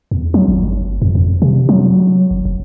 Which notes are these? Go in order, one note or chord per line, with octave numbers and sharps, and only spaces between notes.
E2
F#3
G#1
G1
F2
F2
C3
F#3
F#1
F1